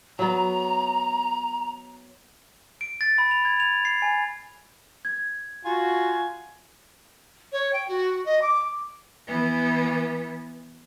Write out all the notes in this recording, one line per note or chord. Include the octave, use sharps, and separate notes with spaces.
F#3 B3 A#5
D7
A6
B5
F7
G#6
F7
C7
G#5
G#6
F4 F#4 G#5
C#5
G5
F#4
D#5
D6
E3 B3